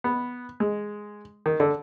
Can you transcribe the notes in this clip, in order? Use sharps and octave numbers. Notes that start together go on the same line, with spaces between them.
B3
G#3
D#3
D3